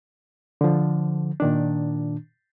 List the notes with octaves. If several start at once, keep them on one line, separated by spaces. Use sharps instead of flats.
D3 F3
A#2 D#3 D4